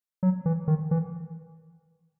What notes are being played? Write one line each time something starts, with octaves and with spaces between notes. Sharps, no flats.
F#3
E3
D#3
E3